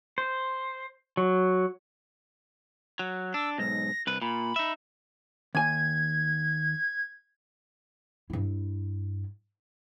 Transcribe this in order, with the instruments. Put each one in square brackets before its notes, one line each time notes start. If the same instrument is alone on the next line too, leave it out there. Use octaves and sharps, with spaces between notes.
[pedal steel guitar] C5
F#3
[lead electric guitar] F#3
[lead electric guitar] D4 [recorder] E6
[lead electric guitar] B1 G#2 [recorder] A#6
[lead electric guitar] C2 B4
[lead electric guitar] A#2 [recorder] B5
[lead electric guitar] D#4 E5
[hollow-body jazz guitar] D#2 G#5 [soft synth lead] G#6
[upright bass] G2 E4